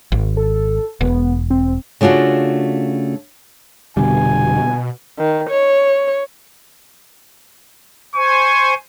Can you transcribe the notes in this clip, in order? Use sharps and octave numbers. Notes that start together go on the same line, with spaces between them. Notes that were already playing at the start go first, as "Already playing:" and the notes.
G#1
A4
E1 B3
C4
C#3 A3 D4 F4 F#4
F1 B2 D3 G3 G#5
D#3
C#5
C5 G#5 C#6